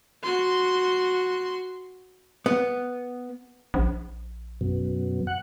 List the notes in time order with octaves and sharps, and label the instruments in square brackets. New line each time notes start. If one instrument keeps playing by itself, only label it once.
[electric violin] F#4 C6
[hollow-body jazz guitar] B3
[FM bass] A#1
[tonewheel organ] F#2 B2
F#5